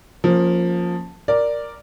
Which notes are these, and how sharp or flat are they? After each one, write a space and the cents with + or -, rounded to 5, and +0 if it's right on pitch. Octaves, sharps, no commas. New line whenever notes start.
F3 +15 A#3 +0 C#4 +0
A#4 +0 D5 +0